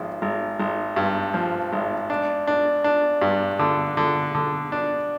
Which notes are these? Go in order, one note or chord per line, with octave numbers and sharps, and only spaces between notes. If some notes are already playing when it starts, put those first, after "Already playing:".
Already playing: G#1 F3
G#1
G#1
G2
F3
G#1
D4
D4
D4
G2
D3
D3
D3
D4